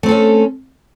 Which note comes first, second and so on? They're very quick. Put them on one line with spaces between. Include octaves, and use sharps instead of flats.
A3 C4 A4 C#4